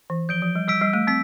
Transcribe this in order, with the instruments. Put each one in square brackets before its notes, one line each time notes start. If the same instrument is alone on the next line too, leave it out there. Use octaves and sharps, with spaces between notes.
[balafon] E3
[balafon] F3 [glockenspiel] G6 D7 G7
[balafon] F3
G3
[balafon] G3 [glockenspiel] E6 B6 D7
[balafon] G3
A3
[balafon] C4 [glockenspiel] E6 B6